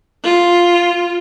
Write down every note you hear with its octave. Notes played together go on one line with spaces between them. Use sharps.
F4